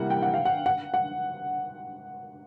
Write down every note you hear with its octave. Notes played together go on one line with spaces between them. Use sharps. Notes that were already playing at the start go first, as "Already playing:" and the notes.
Already playing: C3 E3 G3 A#3 F#5
G5
F#5
F5
F#5
F#5
F#5